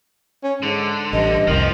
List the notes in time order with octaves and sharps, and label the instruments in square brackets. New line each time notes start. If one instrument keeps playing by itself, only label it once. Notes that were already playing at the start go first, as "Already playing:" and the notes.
[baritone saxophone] C#4
[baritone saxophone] G#2 [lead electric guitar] D3
[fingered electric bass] A1 [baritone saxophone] G2 [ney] D#5
[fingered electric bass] F1 C2 [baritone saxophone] D#3 [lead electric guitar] F3